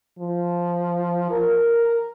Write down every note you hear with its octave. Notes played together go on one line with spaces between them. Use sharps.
F3
A#4